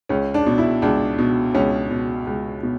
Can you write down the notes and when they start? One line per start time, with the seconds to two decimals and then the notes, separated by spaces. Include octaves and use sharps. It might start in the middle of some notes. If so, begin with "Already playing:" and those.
0.09 C#2 C#4
0.34 D4
0.46 B2
0.58 E4
0.82 C#2 D4
1.19 B2
1.55 C#2 C#4
1.90 B2
2.27 C#2
2.63 B2